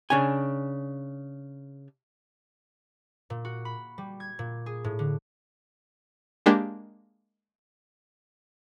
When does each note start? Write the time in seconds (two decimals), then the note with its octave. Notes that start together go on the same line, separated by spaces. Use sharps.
0.10 C#3 D4 C#5 G#5
3.30 A#2
3.45 F#4
3.65 B5
3.98 G3
4.20 G#6
4.39 A#2
4.66 G#4
4.84 A2
4.99 D3
6.46 G#3 A#3 D4 G4